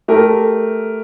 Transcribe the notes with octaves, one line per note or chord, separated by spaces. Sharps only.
A3 G4 A#4